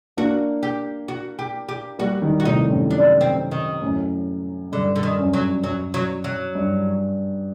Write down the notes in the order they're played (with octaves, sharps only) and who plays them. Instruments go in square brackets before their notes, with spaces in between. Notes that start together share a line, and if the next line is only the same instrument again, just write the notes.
[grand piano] A#3 D4 [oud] F#4
[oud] G4
F#4
G4
G4
[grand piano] G3 A#3 [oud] F#4
[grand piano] D#3 G3
[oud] F#4
[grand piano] A2 C3 [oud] D#4
[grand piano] F#2 A2
[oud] D4
C4
D#3
[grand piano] F#2 A2
[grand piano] G2 [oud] D3
[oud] D3
D#3
[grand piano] F#2
[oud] F#3
[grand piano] F#2 [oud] F#3
[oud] F#3
F#3
[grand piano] G2